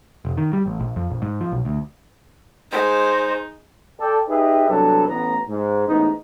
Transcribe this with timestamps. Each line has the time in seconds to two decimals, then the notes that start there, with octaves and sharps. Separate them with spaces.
0.25 F1
0.38 D#3
0.53 G3
0.66 A1
0.80 A#1
0.96 F2
1.10 A#1
1.22 G#2
1.40 F3
1.52 B1
1.65 D2
2.72 G#3 D#4 C5 C6
3.99 A4 D5 G5
4.29 D#4 G4 G#4 B4 D#5 E5
4.69 C2 F#3 B3 D4 A4 B4
5.08 A1 B3 A#5
5.49 G#2
5.87 A1 G#2 B3 D#4